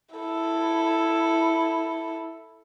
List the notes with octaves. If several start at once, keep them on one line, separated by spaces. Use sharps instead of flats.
E4 A4